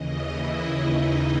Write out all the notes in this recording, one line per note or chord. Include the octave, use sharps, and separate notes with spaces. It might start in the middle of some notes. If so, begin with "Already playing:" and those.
Already playing: D#2 C#3 E3 D#5
E4
D#4